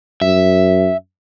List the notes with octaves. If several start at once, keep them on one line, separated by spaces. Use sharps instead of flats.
F#2 E5